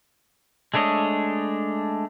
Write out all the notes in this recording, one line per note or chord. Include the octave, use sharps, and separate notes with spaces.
G#3 A3 D4 C#5 D#5